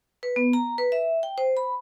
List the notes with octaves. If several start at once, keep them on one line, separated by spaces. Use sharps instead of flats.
B4
B3
A#5
B4
E5
G5
C5
B5